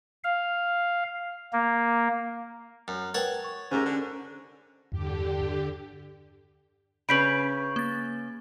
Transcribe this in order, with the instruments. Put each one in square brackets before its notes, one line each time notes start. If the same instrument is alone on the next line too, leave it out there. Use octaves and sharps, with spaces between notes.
[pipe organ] F5
A#3
[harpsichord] F#2
[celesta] A#4 B4 G5 [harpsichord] C#5 F#5 A5
[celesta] C#6
[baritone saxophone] G#2 [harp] C#4 G4 A#4 [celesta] C5
[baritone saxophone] D3
[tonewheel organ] E2 [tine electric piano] G2 [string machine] D3 G4
[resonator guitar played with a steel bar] C#3 C#4 B4 [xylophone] B5 B6 F#7 [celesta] G6 D7
[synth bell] A#3 A6